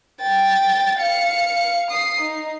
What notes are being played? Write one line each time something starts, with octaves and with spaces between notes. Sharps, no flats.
G5 A6
F5 C#7
D#6 C7
D#4